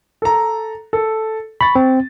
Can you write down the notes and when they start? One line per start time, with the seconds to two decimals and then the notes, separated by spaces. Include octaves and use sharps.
0.22 A4 A#5
0.93 A4
1.61 B5 C#6 A6
1.75 C4